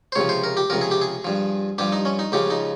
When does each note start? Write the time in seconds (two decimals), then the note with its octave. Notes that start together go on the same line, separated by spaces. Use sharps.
0.12 C5
0.15 C#2 C3 F3 C#5
0.29 C5
0.44 A#4
0.57 G4
0.70 C#2 C3 F3 A#4
0.81 G#4
0.91 G4
1.01 G#4
1.24 G2 F3
1.78 G2 F3 G4
1.92 D#4
2.05 C#4
2.19 D#4
2.32 C#2 C#3 F3 G4
2.50 D#4